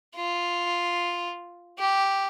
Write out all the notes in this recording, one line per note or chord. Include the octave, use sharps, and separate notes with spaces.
F4
G4